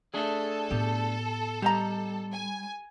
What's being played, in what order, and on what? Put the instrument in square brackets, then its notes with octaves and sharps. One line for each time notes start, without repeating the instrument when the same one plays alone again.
[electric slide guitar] A3 D4 G#4 [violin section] A4
[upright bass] A2 B3 [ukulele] G4
[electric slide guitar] G3 [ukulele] G4 D#5 A#5
[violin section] G#5